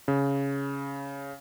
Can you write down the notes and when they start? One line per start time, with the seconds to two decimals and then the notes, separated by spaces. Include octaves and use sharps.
0.08 C#3